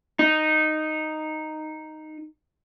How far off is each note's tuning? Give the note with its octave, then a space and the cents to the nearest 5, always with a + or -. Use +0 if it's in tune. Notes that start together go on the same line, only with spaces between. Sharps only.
D#4 -5